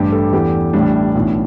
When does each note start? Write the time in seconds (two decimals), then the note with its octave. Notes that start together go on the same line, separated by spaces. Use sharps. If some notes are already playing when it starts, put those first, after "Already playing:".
Already playing: A1 G2 G3 G4
0.12 A4
0.33 E2 E3 A3 G4
0.73 A1 A2 G3 D4
1.15 B1 A2 E3